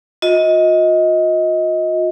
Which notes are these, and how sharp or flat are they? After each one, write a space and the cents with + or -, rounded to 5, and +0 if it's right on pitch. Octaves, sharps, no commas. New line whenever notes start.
F4 +45 D#5 +20